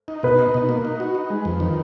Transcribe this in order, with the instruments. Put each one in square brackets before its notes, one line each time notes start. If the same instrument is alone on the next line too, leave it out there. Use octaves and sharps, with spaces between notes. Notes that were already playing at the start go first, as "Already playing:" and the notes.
[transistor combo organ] D#4
[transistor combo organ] B2 [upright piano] B4
[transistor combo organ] D#4
B2
A#3
D#4
F#4
D#4
G#3
F2
D#3